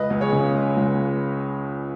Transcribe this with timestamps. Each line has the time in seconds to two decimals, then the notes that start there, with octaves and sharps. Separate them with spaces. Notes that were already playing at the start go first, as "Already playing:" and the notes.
Already playing: C#2 B4 D#5
0.10 C#2
0.21 G#4 C#5
0.32 C#3
0.54 G#3
0.77 C#2